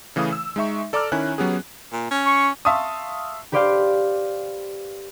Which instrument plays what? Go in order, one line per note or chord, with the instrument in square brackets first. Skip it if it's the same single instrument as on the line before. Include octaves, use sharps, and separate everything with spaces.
[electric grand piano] C#3 E3 A3 F5 D#6
E6
G#3 D#4 E5 C#6
A4 D5 A#5 D6 E6 F6
D#3 C#4 E4 G#5 F#6
F#3 B3 C#4 G4 G#4
[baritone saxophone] A#2
C#4
[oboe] C#6
[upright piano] E5 F5 A5 C6 C#6 D#6
[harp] G4 B4 C5 D5 F5 G5